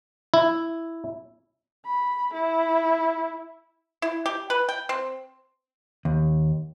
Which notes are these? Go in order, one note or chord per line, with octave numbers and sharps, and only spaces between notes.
E4
B5
E4
E4
G4
B4
G5
C4
D#2